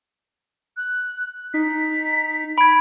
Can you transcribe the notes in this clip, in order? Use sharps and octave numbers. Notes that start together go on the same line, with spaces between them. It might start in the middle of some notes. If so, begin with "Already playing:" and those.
F#6
D#4 B6
B5 G#6 D7